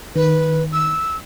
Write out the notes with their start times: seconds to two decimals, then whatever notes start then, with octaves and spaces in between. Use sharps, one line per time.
0.16 D#3 B4
0.73 E6